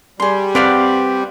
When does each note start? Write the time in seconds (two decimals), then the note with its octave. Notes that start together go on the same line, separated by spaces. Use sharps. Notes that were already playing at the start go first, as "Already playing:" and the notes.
0.20 G3 G#4 C6
0.55 C4 B4 D5 F5 F#5